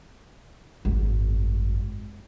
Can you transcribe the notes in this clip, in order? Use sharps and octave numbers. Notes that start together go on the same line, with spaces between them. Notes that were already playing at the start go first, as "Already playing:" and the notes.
G#1 F#2